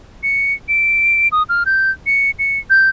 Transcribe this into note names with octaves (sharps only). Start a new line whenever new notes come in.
C#7
D7
D#6
F6
G6
C#7
C#7
G6